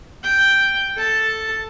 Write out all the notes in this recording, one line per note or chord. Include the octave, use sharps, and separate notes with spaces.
G5
A4 A5